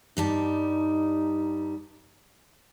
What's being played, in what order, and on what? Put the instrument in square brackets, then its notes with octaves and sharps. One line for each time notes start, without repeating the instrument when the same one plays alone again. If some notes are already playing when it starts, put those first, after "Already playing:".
[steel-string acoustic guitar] G2 G3 A5 [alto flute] D#4